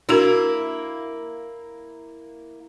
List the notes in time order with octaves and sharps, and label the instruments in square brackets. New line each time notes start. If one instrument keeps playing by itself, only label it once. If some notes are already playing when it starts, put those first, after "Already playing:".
[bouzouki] A#3 E4 [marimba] D4 F#4 A#4